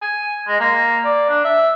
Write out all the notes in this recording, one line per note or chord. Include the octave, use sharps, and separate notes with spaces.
G#5
G#3
A#3
D5
D4
E5